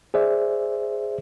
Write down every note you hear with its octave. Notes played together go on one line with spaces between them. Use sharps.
G#4 C5 D5 E5